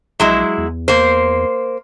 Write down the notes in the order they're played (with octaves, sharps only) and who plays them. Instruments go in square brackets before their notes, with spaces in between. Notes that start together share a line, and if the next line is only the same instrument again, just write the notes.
[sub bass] A#1 [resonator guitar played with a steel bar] F#3 G#3 E4
[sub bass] E2
[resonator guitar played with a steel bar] A#3 C5